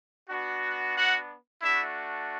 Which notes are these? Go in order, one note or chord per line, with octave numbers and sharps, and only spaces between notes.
B3 D4 F#4
F#4 F#5
A3 D4 E4 F#4 E5